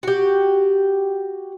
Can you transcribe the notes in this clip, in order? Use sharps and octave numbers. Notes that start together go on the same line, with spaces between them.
F#4 G4